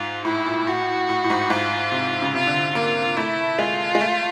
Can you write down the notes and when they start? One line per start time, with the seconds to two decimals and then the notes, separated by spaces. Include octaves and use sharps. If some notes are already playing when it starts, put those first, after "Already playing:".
Already playing: G#2 F4
0.25 A2 E4
0.46 A#2
0.67 A2 F#4
1.09 A2
1.24 A2
1.30 G#2
1.50 G#2 F4
1.92 C3
2.22 C#3
2.34 C3 F4
2.47 D3
2.75 A#3 F4
3.17 A3 E4
3.58 G#3 F4
3.95 G#3
4.01 A3